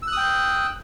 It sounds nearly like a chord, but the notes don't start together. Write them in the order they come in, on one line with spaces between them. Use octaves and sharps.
E6 F#6 D#6 G5